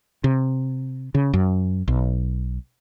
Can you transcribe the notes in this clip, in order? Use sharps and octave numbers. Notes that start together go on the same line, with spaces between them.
C3
C#3
F#2
B1